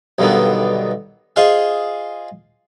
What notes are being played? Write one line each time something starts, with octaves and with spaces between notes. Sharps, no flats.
B1 G2 D3 D#3 B3
F4 G#4 C5 D#5 F5 G#5